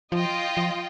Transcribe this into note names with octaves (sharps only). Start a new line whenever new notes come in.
F3 F4 D#5 G5
F3